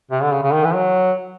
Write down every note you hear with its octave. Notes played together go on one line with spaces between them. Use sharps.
C3
D3
C#3
C#3
D#3
E3
F#3